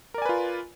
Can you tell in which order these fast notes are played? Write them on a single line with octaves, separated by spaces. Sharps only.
A#4 D5 G#5 B4 F4